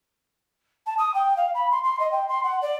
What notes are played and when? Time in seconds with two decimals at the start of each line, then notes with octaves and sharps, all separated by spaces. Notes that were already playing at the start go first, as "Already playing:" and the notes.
0.86 A5
0.98 D#6
1.14 G5
1.37 F5
1.54 B5
1.71 C6
1.84 C6
2.00 D#5
2.12 G5
2.29 C6
2.44 F#5
2.62 D5